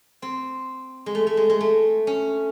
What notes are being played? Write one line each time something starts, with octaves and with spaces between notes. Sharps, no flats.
C4
G#3
A3
A3
G#3
G#3
A3
C#4